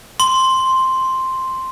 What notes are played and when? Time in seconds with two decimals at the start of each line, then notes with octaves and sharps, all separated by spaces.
0.20 C6